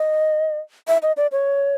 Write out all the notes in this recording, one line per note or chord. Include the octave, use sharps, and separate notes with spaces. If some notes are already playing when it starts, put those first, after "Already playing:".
Already playing: D#5
E5
D#5
D5
C#5